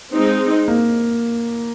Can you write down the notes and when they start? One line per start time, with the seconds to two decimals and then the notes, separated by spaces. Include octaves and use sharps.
0.12 G#3 C4 D#4
0.68 A#3